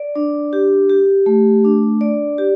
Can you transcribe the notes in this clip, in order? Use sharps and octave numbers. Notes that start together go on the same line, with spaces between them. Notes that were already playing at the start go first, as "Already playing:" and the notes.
Already playing: D5
D4
G4
G4
A3
D4
D5
G4